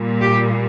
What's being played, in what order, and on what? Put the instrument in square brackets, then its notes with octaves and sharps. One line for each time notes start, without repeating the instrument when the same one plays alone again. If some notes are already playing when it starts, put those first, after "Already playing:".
Already playing: [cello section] A#2 G3
G4